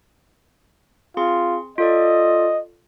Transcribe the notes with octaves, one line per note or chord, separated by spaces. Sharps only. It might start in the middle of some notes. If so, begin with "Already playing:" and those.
C4 F4 G#4 C6
F4 A4 D5 D#5